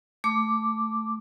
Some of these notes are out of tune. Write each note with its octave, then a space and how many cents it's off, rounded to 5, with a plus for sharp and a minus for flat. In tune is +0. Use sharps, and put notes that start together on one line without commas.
A3 +0 D6 +0